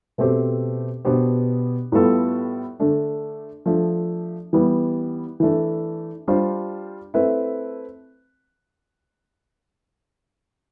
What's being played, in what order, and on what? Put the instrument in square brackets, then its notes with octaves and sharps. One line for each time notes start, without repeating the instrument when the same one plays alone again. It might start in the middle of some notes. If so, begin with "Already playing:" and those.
[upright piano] B2 A3 C4 G4 C5
B2 B3 D4 G4 C5
A2 G3 B3 F4 A4
D3 A3 D4
F3 A3 D4
E3 G3 B3
E3 A3 D4
G3 D4 F4 C5
A3 C4 E4 B4